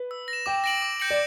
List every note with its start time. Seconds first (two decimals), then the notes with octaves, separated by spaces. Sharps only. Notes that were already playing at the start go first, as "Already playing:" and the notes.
Already playing: B4
0.11 E6
0.28 A#6
0.33 E7
0.46 G5 D6
0.64 A#6 D7 F#7
0.82 D6
1.00 G6 A#6 C#7 F#7
1.10 D5